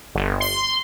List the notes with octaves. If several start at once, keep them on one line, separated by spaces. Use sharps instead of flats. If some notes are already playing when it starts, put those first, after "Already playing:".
G1
C6